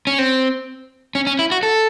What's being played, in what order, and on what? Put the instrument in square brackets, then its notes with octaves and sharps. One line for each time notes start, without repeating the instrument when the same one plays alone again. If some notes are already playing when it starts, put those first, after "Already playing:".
[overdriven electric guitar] C#4
C4
C#4
C#4
E4
F#4
A4